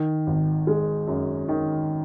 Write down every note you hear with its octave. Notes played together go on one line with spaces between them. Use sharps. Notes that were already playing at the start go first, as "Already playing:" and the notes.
Already playing: D#3
G#1
G#3
F#2
D#3